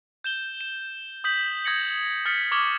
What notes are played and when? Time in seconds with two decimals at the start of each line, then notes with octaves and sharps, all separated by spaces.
0.24 G6 E7 G7
0.61 E7
1.24 D#6 G6 B6 F#7
1.65 D#6 G#6 A#6 C#7 F#7
2.25 D#6 F6 A6 B6 C#7
2.52 C#6 D6 F6 G#6 F#7